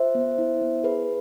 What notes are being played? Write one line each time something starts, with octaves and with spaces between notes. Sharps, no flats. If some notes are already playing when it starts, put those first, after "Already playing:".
Already playing: F4 C5 E5
B3
E4
B3
G#4 B4